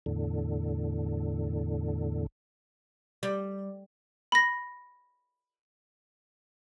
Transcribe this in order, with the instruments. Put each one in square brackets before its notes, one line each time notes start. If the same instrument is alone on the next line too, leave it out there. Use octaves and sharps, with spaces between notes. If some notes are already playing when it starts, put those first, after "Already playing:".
[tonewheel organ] E2 A2 D3
[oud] G3
[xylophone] B5 A#6